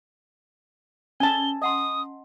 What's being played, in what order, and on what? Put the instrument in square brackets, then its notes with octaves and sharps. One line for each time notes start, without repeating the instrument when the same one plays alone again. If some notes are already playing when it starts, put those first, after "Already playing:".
[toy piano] C#4 [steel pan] G#5 A5 [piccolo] G7
[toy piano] D#5 F#5 C6 [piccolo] D#6